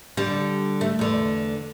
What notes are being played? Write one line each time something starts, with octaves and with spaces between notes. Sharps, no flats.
D3 G3
A3
E2 D3